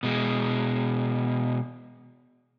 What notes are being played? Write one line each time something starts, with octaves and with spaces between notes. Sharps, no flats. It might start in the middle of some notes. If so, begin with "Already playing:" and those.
B2 G#3